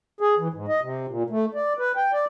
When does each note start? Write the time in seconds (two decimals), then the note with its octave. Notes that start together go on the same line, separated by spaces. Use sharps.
0.21 G#4
0.38 E3
0.54 G#2
0.68 D#5
0.82 C3
1.08 A#2
1.30 A3
1.54 D5
1.79 B4
1.96 G5
2.13 D5